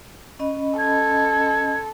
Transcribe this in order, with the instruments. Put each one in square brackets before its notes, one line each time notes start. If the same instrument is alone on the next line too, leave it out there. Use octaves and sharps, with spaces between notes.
[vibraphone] C#4 D#5 B5
[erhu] A4 [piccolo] G#6